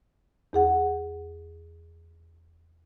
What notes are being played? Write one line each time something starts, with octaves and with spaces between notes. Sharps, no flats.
E2 G#4 F#5